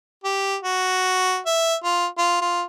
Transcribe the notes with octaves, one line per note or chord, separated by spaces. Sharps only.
G4
F#4
E5
F4
F4
F4